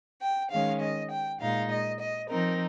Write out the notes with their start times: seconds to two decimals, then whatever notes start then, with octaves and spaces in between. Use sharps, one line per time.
0.22 G5
0.51 D#3 G#3 C#4 F5
0.81 D#5
1.11 G5
1.41 A#2 G#3 D#4 F5
1.70 D#5
2.00 D#5
2.30 F3 C4 D#4 A#4